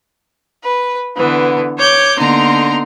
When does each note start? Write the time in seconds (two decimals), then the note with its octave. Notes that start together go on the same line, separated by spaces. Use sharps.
0.64 B4
1.16 D3 E3 B3
1.77 C#5 D6 G6
2.17 D3 A#3 B3 D#4 A#5 C6